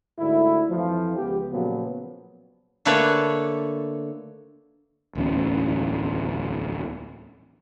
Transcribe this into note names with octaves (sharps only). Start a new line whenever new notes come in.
D2 G#2 D3 E4
F2 E3 F3
C#2 B3 G4
A#2 C#3 F3 F#3 B3
D3 A3 A#3 B4 C#5 D5
D1 A1 E2 C#4